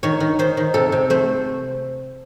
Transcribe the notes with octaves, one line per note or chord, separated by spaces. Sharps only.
D#3 C#5
D#3
D#3 C5
D#3
C3 A4
C3
A3 C5